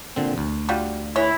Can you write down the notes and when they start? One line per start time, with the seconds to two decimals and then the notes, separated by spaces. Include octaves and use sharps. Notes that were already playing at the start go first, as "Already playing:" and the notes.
0.16 A#2 D3 C4
0.38 D2
0.69 G3 F4 F#4
1.16 E3 G#3 E4 C#5